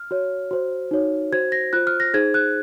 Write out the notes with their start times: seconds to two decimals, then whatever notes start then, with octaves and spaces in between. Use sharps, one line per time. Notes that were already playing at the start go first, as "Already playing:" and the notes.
Already playing: F6
0.11 F#4 C#5
0.51 F#4 C5
0.91 D#4 F#4 C#5
1.32 F#4 C5 G#6
1.52 A#6
1.73 F4 C5 F#6
1.87 F6
2.00 A#6
2.14 D#4 G#4 C5 G#6
2.34 F#6